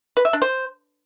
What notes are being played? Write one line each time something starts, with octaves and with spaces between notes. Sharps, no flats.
B4
E5
D4
C5